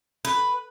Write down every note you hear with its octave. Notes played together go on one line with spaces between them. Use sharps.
B4